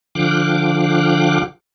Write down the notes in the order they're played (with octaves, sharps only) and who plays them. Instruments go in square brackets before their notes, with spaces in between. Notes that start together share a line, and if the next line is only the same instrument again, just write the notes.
[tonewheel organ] D3 F3 F5 G5 D6 F#6